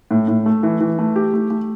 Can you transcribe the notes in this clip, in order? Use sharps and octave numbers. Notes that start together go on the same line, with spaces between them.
A2
A2
A3
E3
E3
A3
G4
A3
A3